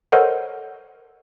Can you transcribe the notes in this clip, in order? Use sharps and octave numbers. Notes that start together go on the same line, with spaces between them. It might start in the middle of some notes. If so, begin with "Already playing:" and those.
A4 A#4 C5 C#5 D#5 F#5